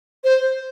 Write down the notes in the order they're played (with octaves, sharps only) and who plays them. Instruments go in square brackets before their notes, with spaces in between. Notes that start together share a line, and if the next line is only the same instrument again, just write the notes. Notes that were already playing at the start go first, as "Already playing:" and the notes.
[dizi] C5